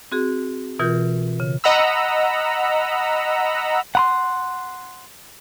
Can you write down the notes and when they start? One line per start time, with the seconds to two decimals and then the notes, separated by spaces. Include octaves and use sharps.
0.12 C4 F#4 G#4
0.79 B2 E3 F4 A#4 G6
1.40 C#3
1.64 D#5 F#5 A#5 B5 E6
3.95 F#5 B5 C6